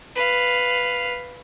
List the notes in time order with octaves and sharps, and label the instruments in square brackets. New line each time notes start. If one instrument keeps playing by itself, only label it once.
[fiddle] B4 F5